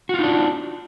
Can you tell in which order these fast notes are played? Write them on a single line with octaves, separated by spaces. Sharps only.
F#4 F4 D#4 D4